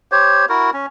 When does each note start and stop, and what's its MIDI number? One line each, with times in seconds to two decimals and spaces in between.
0.12 0.45 67
0.12 0.45 72
0.12 0.45 73
0.49 0.70 64
0.49 0.70 66
0.49 0.70 70
0.74 0.86 61